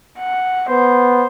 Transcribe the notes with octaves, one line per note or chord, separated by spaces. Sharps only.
F#5
B3 C5